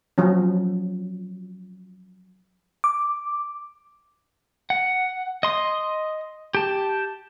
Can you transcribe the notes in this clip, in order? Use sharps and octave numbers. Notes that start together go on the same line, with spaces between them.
F3 F#3 C#4
D6
F#5
D#5 C6 D#6
G4 A5